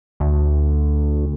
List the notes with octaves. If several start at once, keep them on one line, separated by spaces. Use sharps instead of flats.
D2